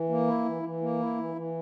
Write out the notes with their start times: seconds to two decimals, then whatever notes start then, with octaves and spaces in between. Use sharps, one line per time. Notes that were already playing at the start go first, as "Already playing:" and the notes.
Already playing: E3
0.09 A#3
0.27 E4
0.45 E3
0.63 E3
0.81 A#3
1.00 E4
1.18 E3
1.36 E3